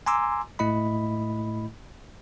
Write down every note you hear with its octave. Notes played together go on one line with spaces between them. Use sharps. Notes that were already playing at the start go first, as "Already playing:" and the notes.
G#5 A#5 C6 D6 E6
A2 A3 E4 D#5 B5